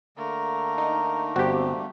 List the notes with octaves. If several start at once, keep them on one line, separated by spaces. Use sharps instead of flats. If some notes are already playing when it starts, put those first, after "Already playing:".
D3 A3 A#3 A#4
D#4
G1 C4 F#4 G4